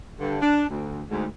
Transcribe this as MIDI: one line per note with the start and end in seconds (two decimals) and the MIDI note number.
0.20 0.37 43
0.20 0.37 50
0.41 0.65 62
0.69 1.01 38
1.10 1.26 38
1.10 1.26 44